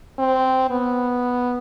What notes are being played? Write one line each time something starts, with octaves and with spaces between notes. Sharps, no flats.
C4
B3